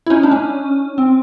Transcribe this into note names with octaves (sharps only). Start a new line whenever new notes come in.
E4
C#4 D#4
D4
C#4
C4